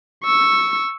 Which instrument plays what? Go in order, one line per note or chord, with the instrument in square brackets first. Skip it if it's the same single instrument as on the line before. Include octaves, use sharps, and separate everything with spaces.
[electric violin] C#6 E6